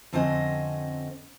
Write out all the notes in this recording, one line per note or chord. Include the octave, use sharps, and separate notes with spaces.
F2 D3 C4 C#4 C5 D#5